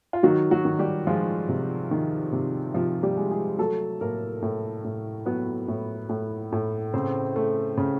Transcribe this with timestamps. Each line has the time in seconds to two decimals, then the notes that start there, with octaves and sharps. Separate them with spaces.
0.13 F4
0.23 D#3 F#3 F#4
0.51 F#3 F#4
0.65 D#3
0.79 G3 G4
1.07 F3 G#3 F4
1.49 C3
1.91 D#3
2.32 C3
2.74 C3 F3 F4
3.03 G3 G4
3.17 G#3
3.31 G#3 G#4
3.58 F#3 A3 A4
4.01 A2 A#3 A#4
4.42 A2
4.84 A2
5.26 F#3 B3 B4
5.68 A2
6.09 A2
6.52 A2
6.94 C#3 C4 C5
7.36 A3
7.77 C#3